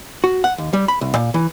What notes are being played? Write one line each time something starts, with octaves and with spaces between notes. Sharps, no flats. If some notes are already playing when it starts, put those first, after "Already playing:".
F#4
F#5
D#2
G3
B5
C2
A#2
E3